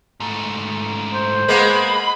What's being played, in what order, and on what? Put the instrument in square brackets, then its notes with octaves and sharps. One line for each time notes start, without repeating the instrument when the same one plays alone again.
[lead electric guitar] G#2 A3
[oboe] C5
[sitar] G#3 A#3 B3 [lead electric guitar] B5